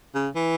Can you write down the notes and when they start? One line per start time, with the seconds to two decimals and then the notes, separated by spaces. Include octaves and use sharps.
0.15 C#3
0.36 E3